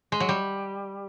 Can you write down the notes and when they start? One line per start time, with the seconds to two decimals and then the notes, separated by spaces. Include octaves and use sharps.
0.12 G#3
0.20 F#3
0.29 G3